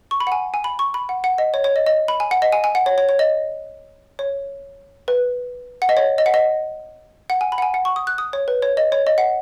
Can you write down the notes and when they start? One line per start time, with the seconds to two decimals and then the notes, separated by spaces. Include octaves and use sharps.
0.11 C#6
0.20 B5
0.27 F#5
0.32 G#5
0.54 G#5
0.64 B5
0.79 C#6
0.94 B5
1.09 F#5
1.24 F#5
1.38 D#5
1.54 C#5
1.64 C#5
1.76 D#5
1.87 D#5
2.08 B5
2.20 G#5
2.31 F#5
2.42 D#5
2.52 G#5
2.64 G#5
2.75 F#5
2.86 C#5
2.98 C#5
3.09 C#5
3.19 D#5
4.19 C#5
5.08 B4
5.82 F#5
5.89 D#5
5.97 C#5
6.18 D#5
6.26 F#5
6.34 D#5
7.30 F#5
7.41 G#5
7.52 B5
7.58 F#5
7.62 G#5
7.74 F#5
7.85 C#6
7.96 D#6
8.07 F#6
8.18 D#6
8.33 C#5
8.48 B4
8.62 C#5
8.77 D#5
8.92 C#5
9.07 D#5
9.18 F#5